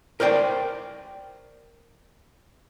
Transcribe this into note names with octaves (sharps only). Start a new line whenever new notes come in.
A#4 C5 D5 G5